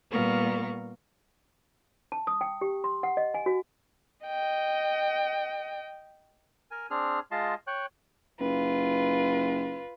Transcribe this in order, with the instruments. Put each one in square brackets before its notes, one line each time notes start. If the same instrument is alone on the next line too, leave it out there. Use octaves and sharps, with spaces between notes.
[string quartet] A#2 G3 B3 A#4 F5 C#6
[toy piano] A5
D#6
G5
G4
C6
F#5
D#5
G#5
F#4
[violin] D#5 G5
[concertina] A#4 G#5
C4 D4 G#4 F6
G#3 F4 D#5 A5 C6
C#5 G5 F#6
[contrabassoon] F#1 [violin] F4 B4